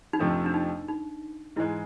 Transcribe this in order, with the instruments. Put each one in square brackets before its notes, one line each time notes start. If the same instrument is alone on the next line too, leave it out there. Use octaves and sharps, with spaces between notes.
[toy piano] D#4
[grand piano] F2 C3 F3 A3 [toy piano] D4
[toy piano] D4
D#4
D#4
[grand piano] G#2 E3 G#3 [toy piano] E4